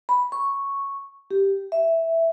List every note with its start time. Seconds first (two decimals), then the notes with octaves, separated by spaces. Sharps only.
0.09 B5
0.32 C#6
1.31 G4
1.72 E5